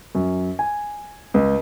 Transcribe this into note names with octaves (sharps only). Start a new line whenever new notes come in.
F#2
G#5
C#2